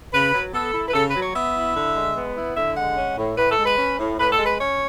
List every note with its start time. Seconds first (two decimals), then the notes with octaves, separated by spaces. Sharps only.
0.13 C#3 B4
0.33 F#3
0.53 B3 A4
0.74 E4
0.88 B4
0.94 C#3 A4
1.08 B4
1.15 F#3
1.21 C#5
1.35 B3 E5
1.56 E4
1.76 D3
1.96 G#3
2.15 B3
2.36 E4
2.56 D3 E5
2.77 G#3 F#5
2.97 C#4
3.17 A2
3.38 A2 B4
3.51 A4
3.58 G#3
3.65 B4
3.78 C#4
3.98 A2
4.18 A2 B4
4.32 A4
4.38 G#3
4.45 B4
4.60 C#4 C#5